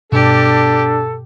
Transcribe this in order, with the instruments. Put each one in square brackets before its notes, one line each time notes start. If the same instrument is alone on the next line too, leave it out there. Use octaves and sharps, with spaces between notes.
[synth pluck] G2 B2 [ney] D4 [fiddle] G4 [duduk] A4